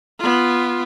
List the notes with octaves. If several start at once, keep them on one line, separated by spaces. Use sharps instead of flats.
B3 F4